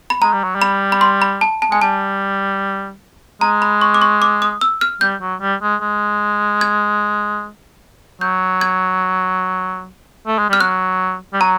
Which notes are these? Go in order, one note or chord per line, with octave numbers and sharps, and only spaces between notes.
B5
G#3 A#5
G3
F#3
G3
B5
B5
C6
B5
A5
A5
G#3 G#5
G3 A5
G#3 A#5
B5
C#6
D6
C#6
D6
D#6
E6
F6
G3 G6
F#3
G3
G#3
G#3
G#6
F#3 G6
G#6
A3
G#3
G3 F6
F#3 F#6
G3
F#3 A#5